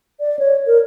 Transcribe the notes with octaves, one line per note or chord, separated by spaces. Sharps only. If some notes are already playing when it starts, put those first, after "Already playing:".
D5
C#5
A#4